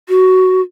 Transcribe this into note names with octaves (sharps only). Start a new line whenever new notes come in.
F#4